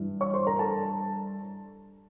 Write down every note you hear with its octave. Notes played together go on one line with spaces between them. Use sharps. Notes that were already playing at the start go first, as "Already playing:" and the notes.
Already playing: G2 E3
C#5 C#6
C5 C6
A#4 A#5
A4 A5